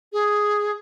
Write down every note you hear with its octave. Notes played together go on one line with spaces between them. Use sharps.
G#4